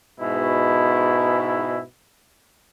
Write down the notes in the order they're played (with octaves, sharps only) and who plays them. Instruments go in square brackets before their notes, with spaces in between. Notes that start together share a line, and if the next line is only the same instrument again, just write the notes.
[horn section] G#2 B2 E4